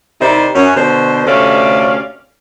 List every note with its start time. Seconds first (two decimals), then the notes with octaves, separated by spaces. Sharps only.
0.21 C3 D#3 D#4 E4 C5 D5
0.55 F#2 C#4
0.77 B2 D3 C5
1.27 D2 C3 A3 C#4 D5 F5